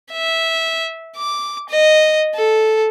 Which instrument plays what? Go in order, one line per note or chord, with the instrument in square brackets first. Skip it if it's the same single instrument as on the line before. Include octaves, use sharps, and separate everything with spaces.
[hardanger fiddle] E5
D6
D#5
A4